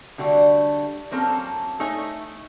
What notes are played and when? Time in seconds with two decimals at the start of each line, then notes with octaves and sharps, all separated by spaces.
0.18 D3 G3 A3 F#4
1.11 F#3 A#3 C4 C#4 A4
1.80 A3 D#4 A4 C#5 G#5